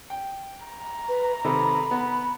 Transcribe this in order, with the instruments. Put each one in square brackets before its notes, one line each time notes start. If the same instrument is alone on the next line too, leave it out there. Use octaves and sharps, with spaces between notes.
[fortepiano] G5
[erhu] A#5
[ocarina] B4
[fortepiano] C3 D#3 A4 [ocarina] B5
[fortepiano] B3